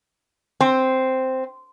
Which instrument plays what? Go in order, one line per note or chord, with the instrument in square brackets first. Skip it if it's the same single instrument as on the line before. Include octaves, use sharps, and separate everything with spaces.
[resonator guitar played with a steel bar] C4